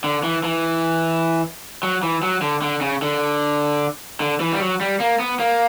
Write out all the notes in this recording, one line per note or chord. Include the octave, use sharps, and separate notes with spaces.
D3
E3
E3
F#3
E3
F#3
D3
D3
C#3
D3
D3
E3
G3
F#3
G3
A#3
B3
A#3